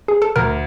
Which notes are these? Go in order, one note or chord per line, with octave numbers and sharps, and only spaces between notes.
G#4
A4
D2 A#4